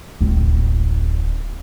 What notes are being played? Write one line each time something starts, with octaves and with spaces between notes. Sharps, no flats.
D1 A1